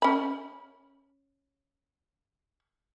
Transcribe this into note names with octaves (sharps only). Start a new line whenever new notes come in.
C#4 B5